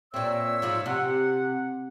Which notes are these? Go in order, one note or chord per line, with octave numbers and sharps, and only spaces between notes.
A#2 C4 C#5 E5 E6
G#2 F3 F4
C3 F#5